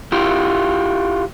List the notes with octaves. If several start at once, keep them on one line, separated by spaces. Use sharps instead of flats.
E4 F4 G4